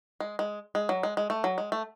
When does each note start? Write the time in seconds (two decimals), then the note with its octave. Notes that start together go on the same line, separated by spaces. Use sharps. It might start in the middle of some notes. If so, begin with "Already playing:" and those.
0.20 G#3
0.39 G#3
0.75 G#3
0.89 F#3
1.03 G#3
1.17 G#3
1.30 A3
1.44 F#3
1.58 G#3
1.72 A3